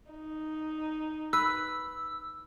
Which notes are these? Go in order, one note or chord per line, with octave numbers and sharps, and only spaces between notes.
D#4
B4 E6